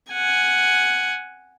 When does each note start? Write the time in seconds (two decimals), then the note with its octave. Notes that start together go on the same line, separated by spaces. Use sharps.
0.12 F#5 G#5